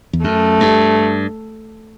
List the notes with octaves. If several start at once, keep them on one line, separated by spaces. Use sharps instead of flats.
E2
F#2 A3
G2